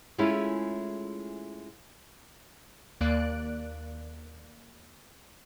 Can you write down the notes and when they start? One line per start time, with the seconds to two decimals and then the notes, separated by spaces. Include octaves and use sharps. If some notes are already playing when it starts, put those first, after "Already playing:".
0.18 G#3 A3 C#4 E4 F4
3.01 D#2 A#3 D5 F#6 D7